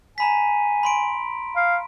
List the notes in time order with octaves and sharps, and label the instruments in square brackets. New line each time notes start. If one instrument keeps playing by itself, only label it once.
[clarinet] G#5 [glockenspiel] A#5 B5 B6
[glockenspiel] B5 C6 D7
[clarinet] F5